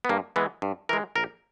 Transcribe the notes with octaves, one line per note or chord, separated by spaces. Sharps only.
B3
G2 A#3
E3 G#3 B3
G2
E3 G#3 A#4
A#1 A#4